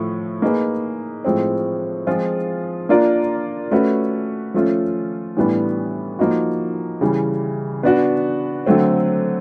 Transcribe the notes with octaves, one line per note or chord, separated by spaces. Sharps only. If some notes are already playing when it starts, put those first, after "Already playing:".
Already playing: A2 F3 A3
A#3 D#4 G#4 B4
A2 F3 G#3 C4
F3 G#3 C4 F4 G#4
A#3 D4 F4 A#4 D5
A3 C#4 F#4 B4
F3 A3 C#4 F4
A2 E3 G3 B3 D4
F3 A#3 D#4 F#4
C#3 E3 G3
B3 D4 F#4
D3 F#3 A3 C4